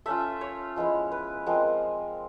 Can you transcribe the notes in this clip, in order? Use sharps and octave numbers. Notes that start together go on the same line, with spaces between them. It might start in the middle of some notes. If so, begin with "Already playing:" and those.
A3 C#4 F4 E5
C#5
F3 G#3 B3 E4
B4
F3 G#3 C4 A#4